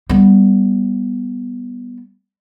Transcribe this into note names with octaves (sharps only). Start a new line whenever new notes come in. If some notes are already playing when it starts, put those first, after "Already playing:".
G3 B3